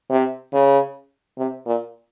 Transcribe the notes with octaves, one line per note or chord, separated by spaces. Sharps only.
C3
C#3
C3
A#2